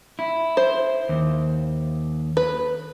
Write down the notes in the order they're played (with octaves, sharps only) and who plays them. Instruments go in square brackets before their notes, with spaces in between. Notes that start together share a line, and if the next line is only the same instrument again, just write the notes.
[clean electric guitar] E4
[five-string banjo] C5
[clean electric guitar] D#2
[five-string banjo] B4